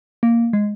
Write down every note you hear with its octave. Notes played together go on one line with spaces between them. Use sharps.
A#3
G#3